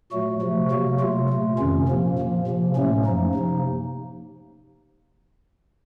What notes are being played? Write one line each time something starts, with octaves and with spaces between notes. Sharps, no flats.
A#2 F#3 A3 F#4
C3 F3 A3
C3 F#3 A#3 F#4
C3 F#3 A3 F4
A#2 A3
F2 C3 D#3 C#4
A#2 F3 A#3
A#2 F3 A#3
C3 F3 A#3
A2 F#3 A3 C#4
F#2 F3 A#3 D#4
C3 F3 A#3